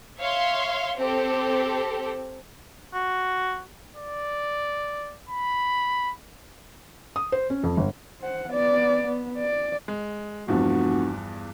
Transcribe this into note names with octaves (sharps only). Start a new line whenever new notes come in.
C#5 E5 F5 C6
C4 G4 A4
F#4
D5
B5
D#6
C5
C#4
F2
G1
C5 F#5
B3 D5
B3
D5
G#3
F1 E2 G2 F3 F#4